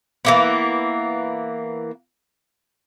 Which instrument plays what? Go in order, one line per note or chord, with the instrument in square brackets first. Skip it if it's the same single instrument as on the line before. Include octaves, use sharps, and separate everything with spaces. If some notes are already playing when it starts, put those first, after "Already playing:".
[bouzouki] E3 A#3 B3